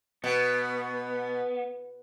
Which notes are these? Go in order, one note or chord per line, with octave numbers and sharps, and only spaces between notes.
B2 B3